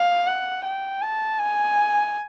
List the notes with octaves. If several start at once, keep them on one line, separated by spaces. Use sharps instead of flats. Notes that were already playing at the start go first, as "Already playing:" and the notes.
Already playing: F5
F#5
G5
A5
G#5